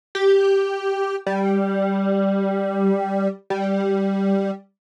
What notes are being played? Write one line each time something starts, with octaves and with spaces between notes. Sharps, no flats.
G4
G3
G3